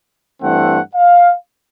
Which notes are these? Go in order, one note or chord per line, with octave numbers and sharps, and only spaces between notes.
G2 E3 A3 C4 F#5
F5